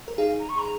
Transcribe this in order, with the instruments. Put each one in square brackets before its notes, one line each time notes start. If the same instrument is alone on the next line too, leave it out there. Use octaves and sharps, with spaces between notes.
[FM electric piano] A#4
[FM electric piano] D#4 G#4 [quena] F5
[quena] A#5
C#6
A#5